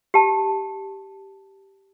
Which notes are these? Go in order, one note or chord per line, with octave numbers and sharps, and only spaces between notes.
G4 A5